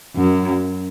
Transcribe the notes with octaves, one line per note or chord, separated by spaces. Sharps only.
F#2